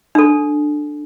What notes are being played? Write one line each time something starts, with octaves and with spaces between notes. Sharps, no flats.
D4 A4